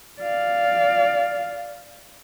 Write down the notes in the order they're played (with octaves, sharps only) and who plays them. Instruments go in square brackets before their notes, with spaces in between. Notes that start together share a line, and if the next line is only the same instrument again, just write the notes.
[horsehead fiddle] D5 F5